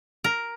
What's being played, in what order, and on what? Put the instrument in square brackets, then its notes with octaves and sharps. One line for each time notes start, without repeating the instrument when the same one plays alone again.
[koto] A#4